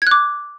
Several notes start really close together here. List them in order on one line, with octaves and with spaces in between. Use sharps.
G#6 F#6 D6